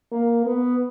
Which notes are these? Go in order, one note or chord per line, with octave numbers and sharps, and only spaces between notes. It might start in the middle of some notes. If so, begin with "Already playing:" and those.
A#3
B3